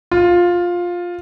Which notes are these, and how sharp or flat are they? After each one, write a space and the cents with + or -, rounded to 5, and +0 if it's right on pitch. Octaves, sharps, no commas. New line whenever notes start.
F4 +10